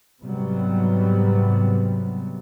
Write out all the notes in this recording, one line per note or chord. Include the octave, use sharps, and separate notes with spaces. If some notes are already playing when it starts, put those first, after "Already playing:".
G#2 C3 F#3 G3 B3